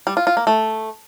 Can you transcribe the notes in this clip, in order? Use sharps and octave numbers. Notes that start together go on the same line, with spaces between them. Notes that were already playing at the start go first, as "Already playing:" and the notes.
G3
F4
F4
A#3
A3